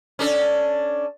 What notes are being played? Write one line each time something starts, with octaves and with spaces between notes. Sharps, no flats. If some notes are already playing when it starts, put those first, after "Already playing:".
C#4 D4 A4